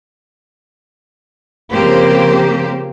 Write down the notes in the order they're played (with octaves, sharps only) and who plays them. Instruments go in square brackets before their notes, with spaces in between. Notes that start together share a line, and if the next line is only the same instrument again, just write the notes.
[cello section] C#3 F3 A#3 C4 G4 C5